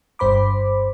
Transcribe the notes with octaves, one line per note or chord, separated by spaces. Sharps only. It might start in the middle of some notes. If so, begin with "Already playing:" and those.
G1 G2 C5 B5 D6